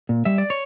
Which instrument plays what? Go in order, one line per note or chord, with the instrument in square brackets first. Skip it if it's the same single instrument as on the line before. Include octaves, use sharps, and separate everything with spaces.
[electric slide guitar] A#2
G3 E5
D5
C#5